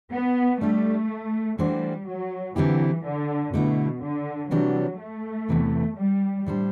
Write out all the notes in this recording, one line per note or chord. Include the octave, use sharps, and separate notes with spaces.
B3
G3 A3 D4 G4
E3 G3 A3 D4 F#4 C5
F#3
D3 E3 F#3 C4 E4 G4
D3
B2 D3 A3 E4
D3
C3 E3 F#3 G3 D4 G4
A3
E2 C3 E3
G3
A2 G3 D4 A4 C5